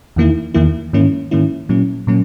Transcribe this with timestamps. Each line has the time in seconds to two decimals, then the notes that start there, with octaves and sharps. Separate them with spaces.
0.16 E2 D#3 A#3 E4
0.54 E2 D#3 A#3 E4
0.93 G#2 D#3 A#3 C#4 E4
1.31 G#2 D#3 A#3 C#4 E4
1.69 A#2 F#3 A#3 C#4 E4
2.07 A#2 F#3 A#3 C#4